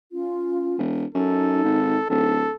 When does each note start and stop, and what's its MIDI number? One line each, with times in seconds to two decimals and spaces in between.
0.13 0.76 61
0.13 0.76 65
0.79 1.05 28
1.15 1.61 42
1.15 2.33 63
1.15 2.06 69
1.64 1.98 32
2.10 2.48 26
2.10 2.56 69